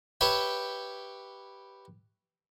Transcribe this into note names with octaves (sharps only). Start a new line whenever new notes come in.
G4 B4 C#5 E5 G5